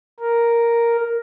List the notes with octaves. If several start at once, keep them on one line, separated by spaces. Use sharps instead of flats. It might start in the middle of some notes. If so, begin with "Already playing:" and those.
A#4